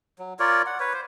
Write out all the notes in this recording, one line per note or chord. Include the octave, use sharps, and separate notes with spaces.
F#3
F4 A#4 C#5 D5
F#5
B4 C#5
C5